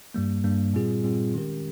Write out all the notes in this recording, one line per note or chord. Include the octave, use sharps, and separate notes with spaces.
G2 G3 A#3
G2 G3 A#3
A#2 G3 C4 F4 G#4
A#2 G3 C4 F4 G#4
D#3 G#3 C#4 G4 A#4